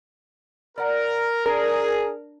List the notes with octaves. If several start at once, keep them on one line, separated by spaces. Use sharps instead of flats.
A#4 D5 F#5
D4 G#4 A#4